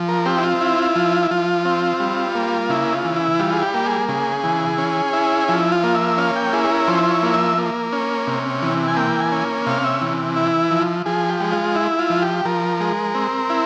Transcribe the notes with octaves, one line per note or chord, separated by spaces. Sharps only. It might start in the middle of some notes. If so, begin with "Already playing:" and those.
Already playing: F3
A#4
C4 G4
E4
F4
E4
F3
E4
F3 F4
C4
G3
A#3
C#3 E4
F4
E3
E4
G3 F4
G#4
G4
A#3
G#4
C#3 G#4
E3
C#4
E4
F3 E4
F4
A#3
E5
C#4 F5
G5
E4 G#4
G#4
A#4
F3 C5
C5
C#5
A#3
E5
A#3
C#4
C3
E3
G#5
A#3 G5
G#5
C#4
C3 F5
E5
E3
E4
F3
F3 G#4
G4
G#3
F4
E4
F4
F3
G4
F3 A#4
G#3
C4
E4